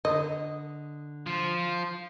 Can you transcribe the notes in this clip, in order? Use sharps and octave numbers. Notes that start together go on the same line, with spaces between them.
D3 D#5
F3 F4